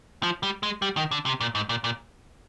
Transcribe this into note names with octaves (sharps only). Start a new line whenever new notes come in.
F3
G3
G#3
G3
D#3
D3
C3
A#2
G#2
A#2
A#2